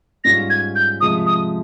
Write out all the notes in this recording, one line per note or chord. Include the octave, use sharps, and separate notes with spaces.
G#2 G3 C#4 F4 A#6
G#6
G6
C3 F3 G#3 D#6
D#6